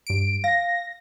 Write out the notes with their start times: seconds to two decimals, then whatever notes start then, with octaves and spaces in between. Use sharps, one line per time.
0.07 G2 D7
0.44 F5 A#6